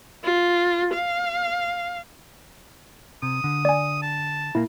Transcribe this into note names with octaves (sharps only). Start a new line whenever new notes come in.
F4
F5
C3 D#6
D3
D5 G#5
A5
A#2 A#3 E4